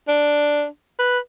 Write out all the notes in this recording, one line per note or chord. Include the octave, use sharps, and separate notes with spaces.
D4
B4